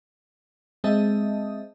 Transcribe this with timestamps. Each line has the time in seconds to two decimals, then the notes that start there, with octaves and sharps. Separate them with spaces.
0.84 G#3 C4 D#5 E5 A5 D#6